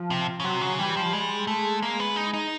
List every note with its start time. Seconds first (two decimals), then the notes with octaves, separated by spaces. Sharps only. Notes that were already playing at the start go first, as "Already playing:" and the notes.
Already playing: F3
0.10 C3
0.40 C#3
0.44 C3 F#3
0.61 C#3
0.78 E3 G3
0.97 F3
1.13 G3 G#3
1.47 A3
1.82 A#3
2.00 B3
2.16 D#4
2.34 D#4